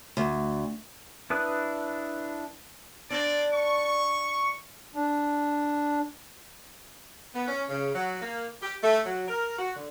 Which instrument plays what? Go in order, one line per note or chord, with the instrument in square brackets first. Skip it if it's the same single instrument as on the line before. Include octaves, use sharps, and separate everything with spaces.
[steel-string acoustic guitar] D2
[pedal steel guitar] D4 E4 B4 D#6 F#6
[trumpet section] C4 D5 [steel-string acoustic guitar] D4
[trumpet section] C#6
[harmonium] D4
[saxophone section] B3
C#4
C#3
F#3
A#3
G4
A3
F#3
A#4
F#4
D3